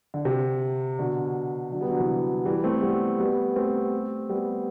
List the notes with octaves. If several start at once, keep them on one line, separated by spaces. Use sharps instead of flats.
D3
C3
B2 D3
D3 F#3
G3 B3
D3 F#3
C3 E3
E3 G3
A3 C4
G3 B3
G3 B3
A3 C4
G3 B3